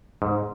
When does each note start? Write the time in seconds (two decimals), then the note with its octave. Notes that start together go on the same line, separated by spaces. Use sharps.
0.22 G#2